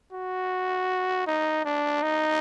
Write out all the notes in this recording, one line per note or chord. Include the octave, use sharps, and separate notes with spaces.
F#4
D#4
D4
D#4